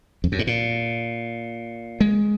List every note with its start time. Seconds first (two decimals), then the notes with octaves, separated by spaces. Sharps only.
0.24 F2
0.32 F#2
0.39 G#2
0.47 A#2
2.01 G#3